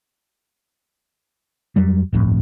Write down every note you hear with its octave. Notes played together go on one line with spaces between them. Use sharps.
F2 F#3 G3
D1 G1 F2 A2